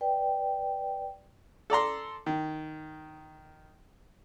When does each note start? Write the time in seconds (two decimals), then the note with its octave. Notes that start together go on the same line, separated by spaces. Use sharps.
0.01 B4 D5 G5
1.70 A4 D5 A#5 C6
2.26 D#3